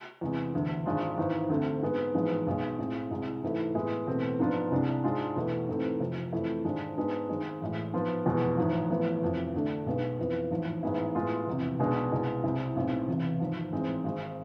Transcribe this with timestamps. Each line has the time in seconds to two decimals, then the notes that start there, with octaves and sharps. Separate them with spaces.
0.21 E2 C3 G#3
0.54 E1 D2 D3
0.86 G#1 G#2 G#3 D4 F4
1.18 G#1 G#2 E3
1.50 D2 D3 A3 C4
1.82 G#2 G#3 B3
2.14 A1 G#2 F3 G#3 B3
2.47 B1 B2 G#3
2.78 A2 G#3 C4
3.11 C2 C3 G#3
3.43 G#2 E3 A3 E4
3.75 A2 G#3 B3 E4
4.07 E2 B2 A3 C4
4.39 G#2 F3 B3 D4 F4
4.71 C2 C3 G#3 D4
5.04 G#2 G#3 D4 F4
5.36 E2 B2 A3 E4
5.68 G#2 E3 A3 C4
6.00 F1 F2 C3
6.33 F2 E3 A3 E4
6.65 G#1 G#2 G#3 D4
6.97 G#2 G#3 B3 D4
7.29 G#1 G#2 G#3
7.61 A1 A2 G#3
7.93 G#2 F3 B3 F4
8.25 F1 E2 B2 G#3
8.57 A1 G#2 F3
8.90 A1 A2 F3 B3
9.22 F1 F2 E3
9.54 D2 D3 A3 D4
9.86 B1 B2 G#3 B3
10.18 F2 E3 B3
10.51 A1 G#2 F3
10.83 A1 G#2 G#3 B3 E4
11.15 A2 G#3 B3 F4
11.47 F1 E2 C3
11.79 B1 B2 G#3 D4
12.12 C2 B2 G#3
12.44 C2 C3 G#3 C4 E4
12.76 B1 A2 G#3 C4 E4
13.08 E1 E2 C3 E3
13.40 G#1 G#2 F3
13.72 A1 G#2 G#3 C4
14.04 G#1 G#2 G#3